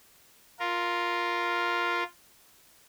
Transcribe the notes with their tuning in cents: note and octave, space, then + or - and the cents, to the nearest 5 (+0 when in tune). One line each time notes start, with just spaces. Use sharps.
F4 +0 A#4 +0